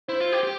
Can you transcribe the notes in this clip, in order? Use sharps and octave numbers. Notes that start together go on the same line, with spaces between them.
E4 C5
F4
G4
G4